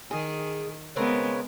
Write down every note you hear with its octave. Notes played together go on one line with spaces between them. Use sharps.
D#3 G#4
C#3 G#3 B3 C4 A#4 B4 C#5